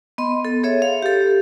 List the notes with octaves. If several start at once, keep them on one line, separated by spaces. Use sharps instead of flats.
B3 D#5 C6
A4
G#4 A4 C#5 E5
F5
G4 A4